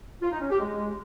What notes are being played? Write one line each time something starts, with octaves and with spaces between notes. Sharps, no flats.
F4
D#4
C#4
G4
G#3